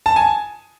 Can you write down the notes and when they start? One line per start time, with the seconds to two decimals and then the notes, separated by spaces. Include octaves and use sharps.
0.06 A5
0.16 G#5